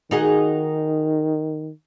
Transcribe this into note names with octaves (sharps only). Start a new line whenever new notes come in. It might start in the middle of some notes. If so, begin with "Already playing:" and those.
D#3 D#4 F#4 G#4